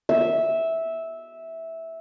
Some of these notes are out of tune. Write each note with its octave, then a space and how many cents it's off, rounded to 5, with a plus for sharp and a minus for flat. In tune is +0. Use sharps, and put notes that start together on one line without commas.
E5 -10